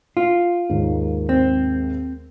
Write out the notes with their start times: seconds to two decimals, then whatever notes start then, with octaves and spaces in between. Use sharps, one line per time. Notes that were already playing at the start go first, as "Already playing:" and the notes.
0.17 F4
0.69 D#2 G#2 D#3
1.29 C4